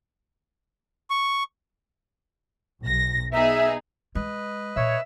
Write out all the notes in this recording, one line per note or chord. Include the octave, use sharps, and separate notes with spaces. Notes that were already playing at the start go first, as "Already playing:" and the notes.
C#6
B1 A#6
B3 D#4 G#4 E5
G#3 B4 D#5
A#2 C#5 E5